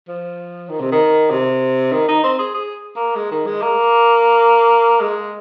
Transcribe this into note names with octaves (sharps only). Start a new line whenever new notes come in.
F3
D#3
C3
D#3
C3
D#3
D#4
C4
G#4
G#4
A#3
G#3
D#3
G#3
A#3
G#3